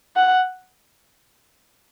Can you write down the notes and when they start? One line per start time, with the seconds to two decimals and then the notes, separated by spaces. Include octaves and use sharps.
0.16 F#5